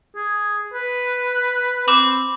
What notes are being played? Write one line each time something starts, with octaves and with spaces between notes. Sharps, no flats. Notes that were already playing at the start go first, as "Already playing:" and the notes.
G#4
B4
C4 B5 D6 E7